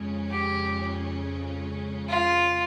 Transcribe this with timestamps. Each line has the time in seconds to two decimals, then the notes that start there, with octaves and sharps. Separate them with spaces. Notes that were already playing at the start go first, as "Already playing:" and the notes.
Already playing: F2 C#3 G#3 C#4
0.31 G4
2.09 F4